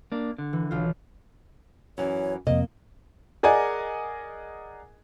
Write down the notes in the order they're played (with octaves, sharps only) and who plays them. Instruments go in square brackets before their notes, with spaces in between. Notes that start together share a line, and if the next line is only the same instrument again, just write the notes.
[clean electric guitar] A#3 D4
D3
[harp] E3
B1 F4
[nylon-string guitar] F#2 E3 [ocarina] C#5
[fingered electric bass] F2 C3 [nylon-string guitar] A#3 [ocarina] C4 [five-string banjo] D#5
[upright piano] G#4 A#4 D5 D#5 F#5 G#5